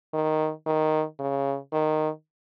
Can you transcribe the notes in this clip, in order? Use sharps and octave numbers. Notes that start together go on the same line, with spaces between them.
D#3
D#3
C#3
D#3